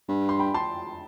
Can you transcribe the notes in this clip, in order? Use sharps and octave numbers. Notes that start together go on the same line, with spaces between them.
G2
C6
G5 B5
A5 C6